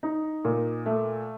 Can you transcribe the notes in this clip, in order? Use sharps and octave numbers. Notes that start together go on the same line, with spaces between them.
D#4
A#2
A3